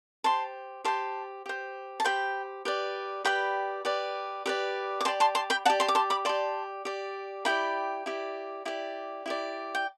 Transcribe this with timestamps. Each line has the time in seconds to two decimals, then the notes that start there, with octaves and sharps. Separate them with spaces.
0.24 G4 C5 A5 C6
0.85 G4 C5 A5 C6
1.46 G4 C5
2.00 A5
2.04 G4 C5 G5 B5
2.65 G4 B4 D5
3.25 G4 B4 D5 G5 B5
3.85 G4 B4 D5
4.46 G4 B4 D5
5.01 D6
5.05 G4 D5 A5 C6
5.20 A5 C6
5.35 A5 C6
5.50 G5 B5
5.65 D5 F#5 A5
5.70 G4
5.80 A5 C6
5.88 D6
5.95 A5 C6
6.10 B5 D6
6.25 G4 D5 A5 C6
6.85 G4 D5
7.45 E4 G4 D5 G5 B5
8.06 E4 G4 D5
8.65 E4 G4 D5
9.26 E4 G4 D5
9.75 G5